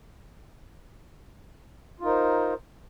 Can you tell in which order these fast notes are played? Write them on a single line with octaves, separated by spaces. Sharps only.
F4 D#4 A#4 C5